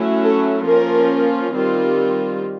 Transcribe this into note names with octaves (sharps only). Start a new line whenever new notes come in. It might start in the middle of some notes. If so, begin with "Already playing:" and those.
Already playing: F#3 A3 C#4 E4
A4
F3 A#3 C#4 F4 A#4
D#3 G3 C4 F4